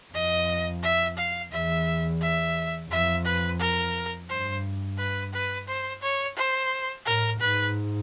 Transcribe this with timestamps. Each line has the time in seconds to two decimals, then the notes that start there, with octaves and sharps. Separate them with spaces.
0.14 F2 D#5
0.83 E5
1.18 F5
1.52 E2 E5
2.21 E5
2.90 F2 E5
3.25 B4
3.60 A#4
4.29 G2 C5
4.98 B4
5.33 B4
5.68 C5
6.02 C#5
6.37 C5
7.06 A2 A#4
7.41 G#2 B4